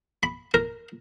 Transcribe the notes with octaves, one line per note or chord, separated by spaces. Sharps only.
B5
A#4